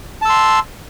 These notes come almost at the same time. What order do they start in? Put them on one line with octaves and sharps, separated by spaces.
A5 E6 C6